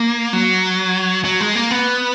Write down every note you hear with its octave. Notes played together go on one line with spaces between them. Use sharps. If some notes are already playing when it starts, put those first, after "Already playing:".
Already playing: A#3
F#3
F#3
G#3
A#3
B3